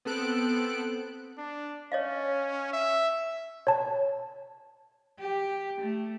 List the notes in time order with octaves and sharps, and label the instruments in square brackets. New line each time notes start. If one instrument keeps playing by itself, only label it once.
[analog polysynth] B3 C4 A4 F#6 D7
[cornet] D4
[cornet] C#4 [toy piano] C#5 D#5 F5
[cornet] E5
[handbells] C#5 A5
[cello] G4
A3